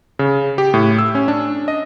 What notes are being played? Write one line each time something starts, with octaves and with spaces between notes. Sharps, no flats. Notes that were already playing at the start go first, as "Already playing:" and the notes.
C#3
G4
A2
E6
C#4
D4
D#5